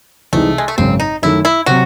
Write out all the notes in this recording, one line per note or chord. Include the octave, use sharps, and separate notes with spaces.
C2 C3 E3 G#3 A3 D#4
G#3
A3
G#1 F#2 C#3 C4
D#4
F#2 D#3 A3 E4
E4
C3 F#3 C4 F#4